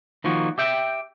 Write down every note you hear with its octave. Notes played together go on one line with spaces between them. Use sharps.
D#3 F3 A#3 F#4
G4 E5 G5